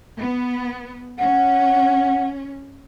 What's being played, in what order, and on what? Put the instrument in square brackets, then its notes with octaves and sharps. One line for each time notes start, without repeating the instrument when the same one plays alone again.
[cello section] B3
[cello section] C#4 [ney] F#5